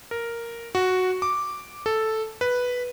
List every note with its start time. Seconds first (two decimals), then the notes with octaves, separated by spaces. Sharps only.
0.11 A#4
0.75 F#4
1.22 D6
1.86 A4
2.41 B4